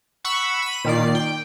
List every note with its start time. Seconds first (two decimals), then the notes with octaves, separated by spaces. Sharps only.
0.24 F#5 B5 C#6 E6
0.62 B5 D#7
0.85 A#2 D#3 D5 C7
1.15 G5